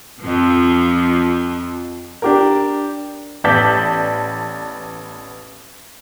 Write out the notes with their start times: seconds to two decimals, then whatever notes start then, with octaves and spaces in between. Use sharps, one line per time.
0.21 F2 F3
2.22 D4 G4 A#4
3.44 A1 B3 D5 A5 G6 B6